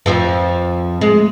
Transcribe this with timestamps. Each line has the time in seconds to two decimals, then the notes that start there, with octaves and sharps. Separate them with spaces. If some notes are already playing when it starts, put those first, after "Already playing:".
0.06 F2 F3
1.01 G#3